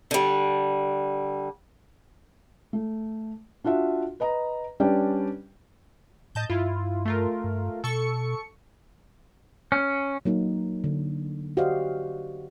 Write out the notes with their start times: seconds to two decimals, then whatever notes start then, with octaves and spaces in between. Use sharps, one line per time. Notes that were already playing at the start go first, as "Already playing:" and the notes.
0.11 D3 G3
2.73 A3
3.64 D4 F4 F#4 E5
4.20 B4 D#5 A#5
4.80 G3 C#4 D4 B4 D5 G5
6.35 A2 D#5 A5 G6
6.50 G2 E4 F4
7.05 A3 F4 A#4
7.44 G2
7.84 B2 A4 C#6 C#7
9.72 C#4
10.25 F#3 A#3 D#4
10.84 D3
11.57 F#4 G4 C5 D5 D#5 F5